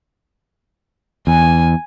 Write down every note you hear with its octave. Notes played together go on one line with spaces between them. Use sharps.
E2 G#5